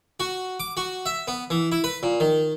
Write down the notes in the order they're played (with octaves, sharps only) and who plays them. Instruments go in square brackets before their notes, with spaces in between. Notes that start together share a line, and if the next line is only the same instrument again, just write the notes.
[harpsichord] F#4
D6
F#4
E5
B3
E3
E4
B4
A#2
D#3